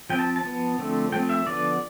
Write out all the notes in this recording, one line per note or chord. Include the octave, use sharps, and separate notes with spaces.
F3 C4 G5
A5
A5
F3 B3
D3 F3 A3 C4
F3 A3 C4 G5
E5
D3 F3 B3 D5